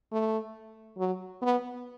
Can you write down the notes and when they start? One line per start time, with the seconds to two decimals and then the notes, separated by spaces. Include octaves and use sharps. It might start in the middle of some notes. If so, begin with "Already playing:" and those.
0.12 A3
0.98 F#3
1.42 B3